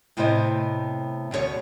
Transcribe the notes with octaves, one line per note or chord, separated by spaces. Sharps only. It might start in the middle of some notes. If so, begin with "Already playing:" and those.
A2 C3 B3 C4 C5 D#5
D2 B2 D#4 C#5 D5